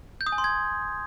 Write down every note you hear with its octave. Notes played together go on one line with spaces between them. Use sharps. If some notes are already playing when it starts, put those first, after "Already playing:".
G6
D#6
G#5
C6
G#6